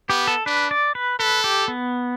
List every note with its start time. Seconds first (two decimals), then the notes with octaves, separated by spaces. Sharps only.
0.09 B3 G4
0.27 A4
0.46 D4 B4
0.71 D5
0.95 B4
1.20 A4 B4
1.44 G4
1.68 B3